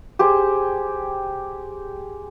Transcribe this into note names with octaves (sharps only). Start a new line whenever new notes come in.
G4 G#4 C5